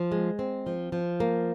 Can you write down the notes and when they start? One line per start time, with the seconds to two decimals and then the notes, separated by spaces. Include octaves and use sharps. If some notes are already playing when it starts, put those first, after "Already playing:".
Already playing: F3
0.12 G#3
0.39 C4
0.66 F3
0.92 F3
1.20 A#3